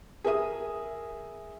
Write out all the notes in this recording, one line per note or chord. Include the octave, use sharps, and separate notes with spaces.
G#4 A#4 E5 D#6